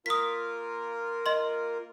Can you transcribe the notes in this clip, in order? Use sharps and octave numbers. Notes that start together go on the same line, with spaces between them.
A#3 F4 A#4 D#6 B6
D#5 C6